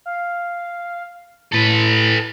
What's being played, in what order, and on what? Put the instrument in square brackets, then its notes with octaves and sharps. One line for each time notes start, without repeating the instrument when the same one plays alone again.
[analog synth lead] F5
[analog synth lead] A2 [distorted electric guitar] A4 B4